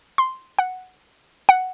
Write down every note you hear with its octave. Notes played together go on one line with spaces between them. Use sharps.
C6
F#5
F#5